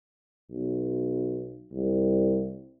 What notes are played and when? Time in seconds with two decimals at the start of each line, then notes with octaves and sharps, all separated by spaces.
0.50 B1
1.72 C2